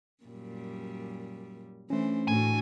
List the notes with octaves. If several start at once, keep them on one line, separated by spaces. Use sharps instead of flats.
F#2 A#2 G3
E3 A3 C#4 D4 C5
A2 D4 F#4 A4 G#5